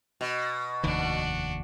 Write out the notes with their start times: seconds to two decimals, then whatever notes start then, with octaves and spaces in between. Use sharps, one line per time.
0.21 B2
0.83 F1 D#2 D#3 D4 F#4